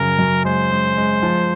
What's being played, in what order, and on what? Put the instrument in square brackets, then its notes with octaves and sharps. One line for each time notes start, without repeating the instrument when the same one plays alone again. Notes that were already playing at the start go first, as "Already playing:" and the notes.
Already playing: [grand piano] F#2 C#3 [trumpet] A#4
[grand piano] F#2
[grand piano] G#3 [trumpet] C5
[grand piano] G#3
G#3
F3